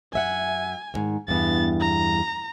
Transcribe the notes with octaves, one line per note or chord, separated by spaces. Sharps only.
F#2 E5 F#5 G#5
E2 G#2 D#3
E2 G2 B3 A6
A#5